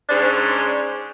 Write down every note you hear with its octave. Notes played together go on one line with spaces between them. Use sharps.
G#2 C#4 D4 G#4 C5